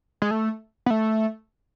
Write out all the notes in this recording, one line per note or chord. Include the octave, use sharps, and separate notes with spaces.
G#3
A3
B3
A3